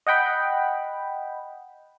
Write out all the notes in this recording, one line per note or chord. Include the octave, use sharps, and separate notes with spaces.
D#5 F#5 G5 B5